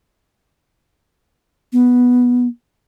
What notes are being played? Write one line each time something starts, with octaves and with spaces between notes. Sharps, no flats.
B3